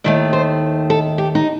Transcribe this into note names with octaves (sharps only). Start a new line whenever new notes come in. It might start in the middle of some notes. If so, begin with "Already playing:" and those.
D#2 D#3 A3 D5
C5
A4
G4
D#4